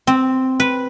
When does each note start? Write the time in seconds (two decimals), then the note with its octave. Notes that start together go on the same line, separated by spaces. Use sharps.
0.07 C4
0.60 B4